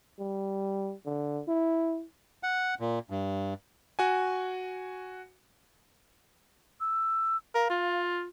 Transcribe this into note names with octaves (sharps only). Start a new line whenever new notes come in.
G3
D3
E4
F#5
A#2
G2
F#4 G#5
E6
A#4 F5
F4